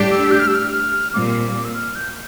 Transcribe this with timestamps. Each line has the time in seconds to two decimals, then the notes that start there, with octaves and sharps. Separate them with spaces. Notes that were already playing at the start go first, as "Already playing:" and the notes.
Already playing: A2 G3 D4 G4
0.11 E6
0.31 G6
0.39 F6
0.47 E6
0.55 F6
1.14 A#2 G3 C4 D6
1.65 E6
1.74 F6
1.95 G6